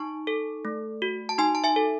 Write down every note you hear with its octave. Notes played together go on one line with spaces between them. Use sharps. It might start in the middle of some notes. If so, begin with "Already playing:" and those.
Already playing: D#4 A5 C#6
A4
A3
F#4
A5
D#4 G#5 C6
A5
E5 G#5
A4